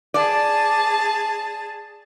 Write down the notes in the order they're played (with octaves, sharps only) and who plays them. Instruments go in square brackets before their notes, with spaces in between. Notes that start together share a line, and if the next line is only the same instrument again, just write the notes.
[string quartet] G#4 A5 [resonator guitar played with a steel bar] D5